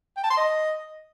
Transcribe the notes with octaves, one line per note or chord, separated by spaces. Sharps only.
G5
A5
C6
D#5